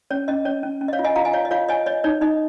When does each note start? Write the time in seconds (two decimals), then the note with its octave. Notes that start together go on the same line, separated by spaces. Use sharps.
0.11 C#4 C#5
0.28 C#4 D#5
0.45 C#4 C#5
0.63 C#4
0.81 C#4
0.88 D#5
0.93 C#5 F5
0.99 F4
1.05 D#5 G#5
1.16 F4 F5 A#5
1.25 D#5 G#5
1.33 C#5 F5
1.45 D#5
1.51 F4 C#5 F5
1.69 C#5 D#5 G#5
1.86 C#5 D#5
2.04 D#4 C#5
2.21 D#4 D#5